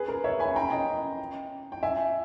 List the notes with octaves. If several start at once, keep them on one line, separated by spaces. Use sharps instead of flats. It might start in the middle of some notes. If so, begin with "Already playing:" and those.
Already playing: G#4 B4
A#4
C#5 E5
G#5 B5
G5 A#5
D#5 G5
G5
E5 G#5